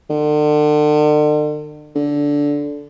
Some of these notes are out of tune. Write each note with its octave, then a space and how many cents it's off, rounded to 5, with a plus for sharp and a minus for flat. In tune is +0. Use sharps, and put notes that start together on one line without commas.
D3 +40
D3 -15